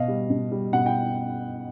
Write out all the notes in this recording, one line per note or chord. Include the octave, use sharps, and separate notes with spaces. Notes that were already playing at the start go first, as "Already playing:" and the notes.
Already playing: B2 D#5 F5
G3
B2
G3
B2 F#5
G5